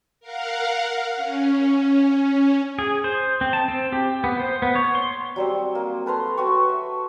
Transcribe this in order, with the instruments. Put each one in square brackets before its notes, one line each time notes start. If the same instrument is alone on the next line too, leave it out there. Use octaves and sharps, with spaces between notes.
[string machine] A#4 F5 F#5
C#4
[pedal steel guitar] G#4
C5
C4
A5
C4
G4
B3
C5
B3
C#5
C6
[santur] F#3 G3 C4
A#3
A4 B4 A#5 C6
F#4 B4 G5 C#6
E5